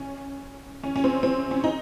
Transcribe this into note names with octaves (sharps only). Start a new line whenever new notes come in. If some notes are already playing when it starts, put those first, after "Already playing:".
Already playing: C#4
C#4
C#4
C4
C4
C#4
D#4